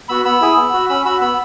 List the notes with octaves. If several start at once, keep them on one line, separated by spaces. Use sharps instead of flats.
B3 F#4 B5 E6
B3 B5 E6
E4 G#4
B3
F#4
C#4 B5 E6
F#4 B5 E6
B3 B5 E6